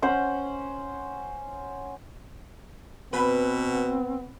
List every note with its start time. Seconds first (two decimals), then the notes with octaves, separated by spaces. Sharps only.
0.02 C#4 C5 F#5
3.13 B2 B3 C4 B4